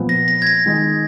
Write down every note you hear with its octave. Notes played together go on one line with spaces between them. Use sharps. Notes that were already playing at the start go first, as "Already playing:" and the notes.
Already playing: A#2 F3 B3
A#6
A#6
G#6
A#6
D#3 G#3 D#4 G#4